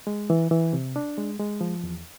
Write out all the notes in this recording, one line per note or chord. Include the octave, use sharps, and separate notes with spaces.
G#3
E3
E3
C3
D4
G#3
G#3
F3
E2